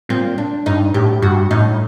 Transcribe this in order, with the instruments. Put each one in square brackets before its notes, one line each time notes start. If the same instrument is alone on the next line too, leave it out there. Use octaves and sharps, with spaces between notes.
[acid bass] A#2 [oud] C4
[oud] D4
[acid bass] G2 [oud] D#4
[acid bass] A2 [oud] G4
[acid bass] G2 [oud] F#4
[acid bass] A2 [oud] D#4